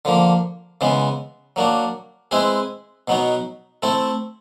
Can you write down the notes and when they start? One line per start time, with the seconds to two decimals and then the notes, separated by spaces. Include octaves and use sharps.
0.05 D3 F3 A#3
0.81 C#3 E3 G#3 B3
1.56 F#3 A#3 D4 F#4
2.31 G#3 C4 E4 G#4 B4
3.08 B2 F#3 B3 D#4 F#4
3.82 A3 C4 E4 A4